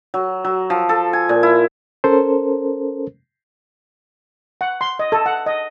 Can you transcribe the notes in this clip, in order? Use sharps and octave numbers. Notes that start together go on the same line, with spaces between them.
F#3
F#3
F3
A4
G#5
A#2
E4
C#4 A4 A#4 C5
F#5
C6
D#5
A4
F#5
D#5